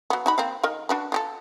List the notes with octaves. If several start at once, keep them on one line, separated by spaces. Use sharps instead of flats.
F#3 B3
D#4 F#4 B5
A#3 C4 F5
D#3 A#4 D#5
D4 F#4 B4
F4 G4 A4